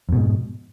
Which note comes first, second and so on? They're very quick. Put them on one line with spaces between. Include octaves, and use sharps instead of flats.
F2 B2 G#2